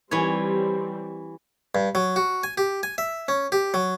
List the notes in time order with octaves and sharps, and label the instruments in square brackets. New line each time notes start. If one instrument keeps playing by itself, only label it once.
[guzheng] E3 C#5 [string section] G3 C4
[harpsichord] G2
F#3
F#4
G#5
G4
G#5
E5
C#4
G4
F#3